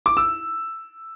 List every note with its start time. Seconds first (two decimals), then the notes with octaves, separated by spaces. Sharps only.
0.06 D6
0.17 E6